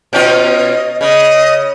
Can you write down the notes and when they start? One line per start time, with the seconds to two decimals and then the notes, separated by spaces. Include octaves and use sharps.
0.13 B2 C#4 F4 D#5
1.01 C#3 D#5